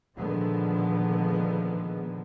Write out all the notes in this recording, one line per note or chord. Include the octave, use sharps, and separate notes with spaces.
A#2 D3 D#3 F3 G#3 B3